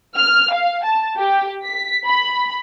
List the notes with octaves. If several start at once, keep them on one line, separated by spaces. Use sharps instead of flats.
F6
F5
A5
G4
B6
B5